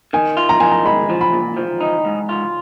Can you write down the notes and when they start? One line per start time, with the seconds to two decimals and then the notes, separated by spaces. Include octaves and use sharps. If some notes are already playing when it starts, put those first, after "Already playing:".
0.13 D#3 G#5
0.37 F4
0.49 A#5
0.60 D#3 G#5
0.71 A#5
0.85 G#3 B5
1.10 F3
1.21 B5
1.33 A#2
1.57 F3
1.81 D#4
2.05 G#2
2.29 F4